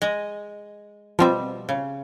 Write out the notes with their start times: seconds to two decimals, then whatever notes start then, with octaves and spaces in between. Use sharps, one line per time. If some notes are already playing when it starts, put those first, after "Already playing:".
0.02 G#3 D#5
1.19 B2 F3 G3 C4 E5
1.69 C#3